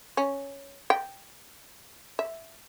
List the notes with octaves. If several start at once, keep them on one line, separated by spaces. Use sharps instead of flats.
C#4
G5
E5